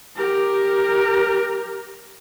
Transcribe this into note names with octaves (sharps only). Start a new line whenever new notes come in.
G4 A#4